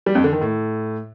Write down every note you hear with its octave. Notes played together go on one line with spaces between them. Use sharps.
G3
F2
D3
D#3
A2